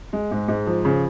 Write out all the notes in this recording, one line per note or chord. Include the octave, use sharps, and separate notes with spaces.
G#3
G#2
G#2
F3
C#3